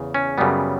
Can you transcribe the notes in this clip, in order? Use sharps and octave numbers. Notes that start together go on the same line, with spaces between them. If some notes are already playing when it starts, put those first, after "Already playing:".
Already playing: E2 C#3
C#4
F#2 C#3 G3 B3